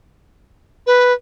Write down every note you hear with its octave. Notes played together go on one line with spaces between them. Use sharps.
B4